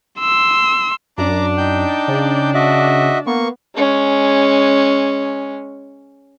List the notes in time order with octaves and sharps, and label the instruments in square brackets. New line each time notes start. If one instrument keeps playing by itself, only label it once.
[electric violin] C6 E6
[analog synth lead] F#2 [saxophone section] D4 [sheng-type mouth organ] A#5 D6
[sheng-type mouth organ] D#4 G5 G6
[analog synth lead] C#3
[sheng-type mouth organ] F#4 D#5 E5
[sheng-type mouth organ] A#3 C#6 [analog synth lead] B3
[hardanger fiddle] G#3 C#4